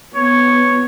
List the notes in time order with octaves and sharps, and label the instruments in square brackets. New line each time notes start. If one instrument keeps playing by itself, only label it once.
[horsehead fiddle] B3 [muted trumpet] C#5